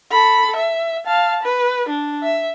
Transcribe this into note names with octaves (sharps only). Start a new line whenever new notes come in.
A4 B5
E5
F5 A5
B4
D4
E5